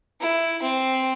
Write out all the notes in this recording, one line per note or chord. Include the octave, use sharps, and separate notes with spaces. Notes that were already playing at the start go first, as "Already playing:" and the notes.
E4
C4